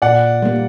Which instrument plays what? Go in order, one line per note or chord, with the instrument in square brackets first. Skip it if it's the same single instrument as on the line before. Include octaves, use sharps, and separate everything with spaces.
[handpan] A#2 [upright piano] D5 F#5
[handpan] G3 A#3